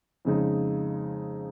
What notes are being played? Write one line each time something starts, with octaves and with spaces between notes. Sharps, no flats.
F2 C#3 G#3 D#4